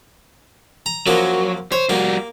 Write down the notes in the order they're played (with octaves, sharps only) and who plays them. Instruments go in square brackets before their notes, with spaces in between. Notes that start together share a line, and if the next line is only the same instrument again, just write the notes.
[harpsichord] A#5
[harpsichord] F#2 F3 A#3 [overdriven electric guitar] F#3
[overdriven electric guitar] C5 [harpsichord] C#5
[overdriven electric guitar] G3 F#4 [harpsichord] A#3